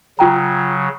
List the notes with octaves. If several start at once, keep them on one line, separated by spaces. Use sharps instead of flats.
C#3 F#3 F4 G5 A#5